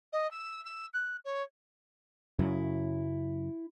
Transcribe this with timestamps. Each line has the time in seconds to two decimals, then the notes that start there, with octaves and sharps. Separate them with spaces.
0.12 D#5
0.31 E6
0.65 E6
0.93 F#6
1.24 C#5
2.39 F#2 C#3 F#3 E4